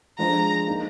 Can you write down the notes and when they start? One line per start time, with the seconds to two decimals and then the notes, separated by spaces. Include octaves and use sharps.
0.18 F3 G#3 D4 G#4 C5 A#5
0.67 A#3 D#4 A#4